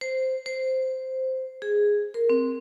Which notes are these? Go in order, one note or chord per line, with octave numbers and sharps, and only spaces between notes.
C5
C5
G#4
A#4
C4